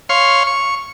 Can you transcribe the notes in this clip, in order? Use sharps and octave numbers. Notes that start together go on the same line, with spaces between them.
C#5 F5 C6
C#6